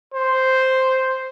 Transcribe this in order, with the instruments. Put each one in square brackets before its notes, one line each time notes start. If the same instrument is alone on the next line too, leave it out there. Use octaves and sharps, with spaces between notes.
[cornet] C5